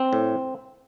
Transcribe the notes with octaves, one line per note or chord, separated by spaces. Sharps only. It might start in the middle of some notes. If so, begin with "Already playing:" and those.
Already playing: C4
A2